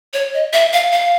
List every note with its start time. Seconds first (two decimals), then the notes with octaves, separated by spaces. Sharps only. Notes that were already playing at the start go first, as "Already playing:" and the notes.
0.13 C#5
0.34 D#5
0.53 E5
0.73 F5
0.92 F5